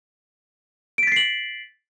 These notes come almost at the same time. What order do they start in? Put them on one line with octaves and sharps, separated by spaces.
D7 B6 A6 C7 F#7